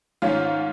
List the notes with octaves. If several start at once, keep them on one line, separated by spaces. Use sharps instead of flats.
G#2 D#3 C#4 F4